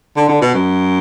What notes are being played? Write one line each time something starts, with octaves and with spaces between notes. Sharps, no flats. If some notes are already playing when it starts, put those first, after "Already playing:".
D3
D3
B2
F#2